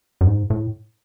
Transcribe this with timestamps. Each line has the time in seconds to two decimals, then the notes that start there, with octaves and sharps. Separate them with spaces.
0.21 F#2
0.27 G#2
0.50 A2